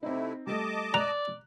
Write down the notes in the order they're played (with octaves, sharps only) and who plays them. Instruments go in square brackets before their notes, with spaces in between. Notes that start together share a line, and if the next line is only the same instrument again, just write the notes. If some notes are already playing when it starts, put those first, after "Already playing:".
[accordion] C3 A3 E4 [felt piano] C4 D#4
[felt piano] G3 A3 [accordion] D#5 A5 D6
[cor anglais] D5 [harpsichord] A#5 [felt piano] F#6